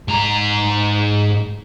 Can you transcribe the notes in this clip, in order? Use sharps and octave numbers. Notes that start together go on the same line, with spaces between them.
G#2 A#5